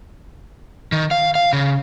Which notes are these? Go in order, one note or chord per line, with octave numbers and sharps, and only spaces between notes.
D#3
F5
F5
C#3